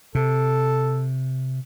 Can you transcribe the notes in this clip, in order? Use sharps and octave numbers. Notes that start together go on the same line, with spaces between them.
C3 A4